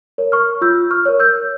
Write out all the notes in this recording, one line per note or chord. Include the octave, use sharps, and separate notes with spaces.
A#4 C#5
C#6 F6
F4 E6 G6
C#6 F6
A#4 C#5
E6 G6